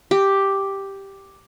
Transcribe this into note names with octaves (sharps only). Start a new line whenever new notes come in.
G4